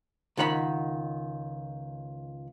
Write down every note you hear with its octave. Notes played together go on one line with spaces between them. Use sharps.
C#2 D#3 F#5 B5